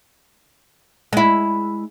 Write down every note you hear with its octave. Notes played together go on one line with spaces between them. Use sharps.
G#3 E4